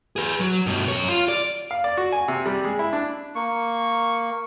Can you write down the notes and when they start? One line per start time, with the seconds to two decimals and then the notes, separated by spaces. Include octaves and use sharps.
0.16 G#4 B4
0.40 F#3
0.66 G2 B2
0.88 F#2 C#5
1.08 F4
1.28 D5
1.71 F5
1.84 D5
1.97 F#4
2.12 G#5
2.28 C3
2.46 G3
2.64 G#3
2.79 E4
2.93 D4
3.35 A#3 C#6